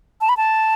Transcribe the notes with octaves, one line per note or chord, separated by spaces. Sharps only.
A5
B5
A5